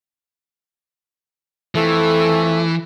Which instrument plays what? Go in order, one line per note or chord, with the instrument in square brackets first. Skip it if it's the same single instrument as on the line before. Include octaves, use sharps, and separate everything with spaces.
[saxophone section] F2 A3 [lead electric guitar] E3